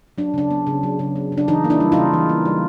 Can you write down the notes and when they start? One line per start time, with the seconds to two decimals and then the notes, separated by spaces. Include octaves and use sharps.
0.18 F#3 D4
0.34 C#3 D4
0.51 B3
0.67 C#3
0.83 F#3
0.99 C#3
1.16 B3
1.32 C#3
1.38 D4
1.48 E3 D#4
1.64 A#3
1.70 D4 E4
1.80 G3
1.92 C#3 D#4 F4
2.14 E3
2.29 A#3
2.46 G3